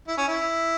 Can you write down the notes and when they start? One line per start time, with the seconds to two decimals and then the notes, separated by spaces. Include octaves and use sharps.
0.08 E4
0.18 C#4
0.28 E4